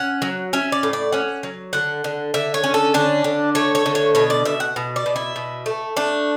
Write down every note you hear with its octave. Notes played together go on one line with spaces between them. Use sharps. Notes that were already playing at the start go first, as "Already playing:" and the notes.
Already playing: C#4 F#5
F#3
C#4 E5
D5
A2
D5
C#4 F#5
F#3
D3 F#5
D3
D3 E5
C#5
C#4
A4
D3 D4
D3
A3 C#5
C#5
D3
C#5
B2 C#5
D5
B2 E5
F#5
B2
D5
B2
E4
B2
A3
A3 D4